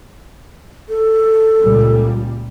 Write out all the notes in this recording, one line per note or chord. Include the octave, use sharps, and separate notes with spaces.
A4
C#2 A#2 G3